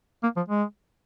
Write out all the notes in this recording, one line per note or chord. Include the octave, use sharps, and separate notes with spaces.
A#3
F3
G#3